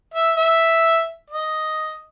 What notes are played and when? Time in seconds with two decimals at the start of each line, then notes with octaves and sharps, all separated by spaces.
0.14 E5
0.37 E5
1.30 D#5